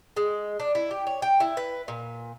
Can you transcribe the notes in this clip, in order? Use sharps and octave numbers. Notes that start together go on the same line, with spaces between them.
G#3
D4
E4
G4
C#5
G5
E4
B4
A#2